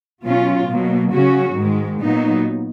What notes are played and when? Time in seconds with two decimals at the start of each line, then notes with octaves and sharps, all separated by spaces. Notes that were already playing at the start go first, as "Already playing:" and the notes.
0.23 B2 F#3 C#4 F4
0.68 B2 F#3 A#3
1.12 C#3 F#3 C#4 F#4
1.56 G#2 D#3 G#3
2.01 A#2 F#3 B3 D#4